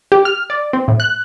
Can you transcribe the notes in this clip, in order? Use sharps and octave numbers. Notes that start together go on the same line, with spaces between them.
G4
F6
D5
C4
A2
F#6